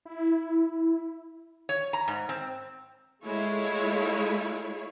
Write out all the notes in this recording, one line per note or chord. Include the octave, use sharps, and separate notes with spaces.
E4
C#5
A#5
G#2
C4
G#3 A3 E4 F4 C#5